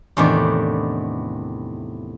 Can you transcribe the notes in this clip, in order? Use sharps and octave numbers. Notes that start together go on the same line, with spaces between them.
E2 A2 C3 D#3 B3 D4